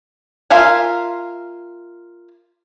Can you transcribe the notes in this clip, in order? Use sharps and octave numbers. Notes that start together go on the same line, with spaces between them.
F4 A#4 E5 F5 G#5